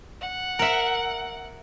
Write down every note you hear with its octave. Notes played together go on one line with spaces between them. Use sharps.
F#5
A#4 E5